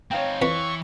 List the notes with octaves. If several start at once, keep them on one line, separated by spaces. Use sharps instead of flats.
C4 D#4 C#5 F5 G5
F2 E3 B4 B5 C#6